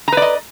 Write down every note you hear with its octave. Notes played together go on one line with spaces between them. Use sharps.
B4 D5 D#5 A#5